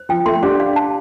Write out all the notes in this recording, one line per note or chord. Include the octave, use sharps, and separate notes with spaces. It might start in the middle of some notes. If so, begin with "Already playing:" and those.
Already playing: C5
F3 G5
F3 A3 C6
D4 G4 C5
F5
A5